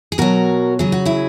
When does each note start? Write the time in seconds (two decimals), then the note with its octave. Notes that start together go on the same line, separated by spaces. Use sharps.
0.12 G#4
0.18 B2 F#3 F#4 A#4
0.79 C#3 F#3 G#4
0.92 F#4
1.05 E4 G#4